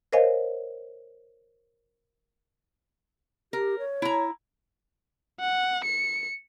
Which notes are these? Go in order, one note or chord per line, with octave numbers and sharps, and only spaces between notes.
A#4 C5 C#5 D#5 F5 G#5
G4 A#4
C#5
E4 A#5
F#5
C#7